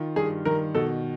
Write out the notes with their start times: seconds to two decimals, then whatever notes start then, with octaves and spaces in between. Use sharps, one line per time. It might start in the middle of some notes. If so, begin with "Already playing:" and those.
Already playing: D#3 F4
0.16 G2 G#4
0.45 D#3 A#4
0.75 B2 A4